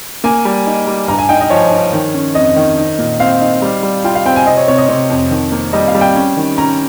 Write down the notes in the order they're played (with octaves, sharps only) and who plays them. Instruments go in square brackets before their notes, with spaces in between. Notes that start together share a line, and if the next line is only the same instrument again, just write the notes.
[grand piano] A#3 [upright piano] G#5
[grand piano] G3
D#4
G3
[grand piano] G2 [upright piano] A#5
[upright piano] G#5
[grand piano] D#4 [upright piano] G5
[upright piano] D#5
[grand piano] F3 [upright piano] C#5
[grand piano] D#4
D#3
C#4
[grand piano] F2 [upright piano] D#5
[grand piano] D#3
D#4
A#2
[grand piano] C4 [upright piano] F5
[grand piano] D#4
G3
G3
[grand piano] F4 [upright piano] G5
[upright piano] F5
[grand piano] C4 [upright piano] G5
[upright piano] G#5
[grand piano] C3 [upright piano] D#5
[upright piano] C#5
[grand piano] C3 [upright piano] C#5
[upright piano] D#5
[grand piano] C3 [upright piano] C#5
[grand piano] F2
D#3
A#3
[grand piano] G3 [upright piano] D#5
[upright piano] F5
[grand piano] G3
[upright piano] G5
[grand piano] C#4
D#3
[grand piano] C#4 [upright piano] A#5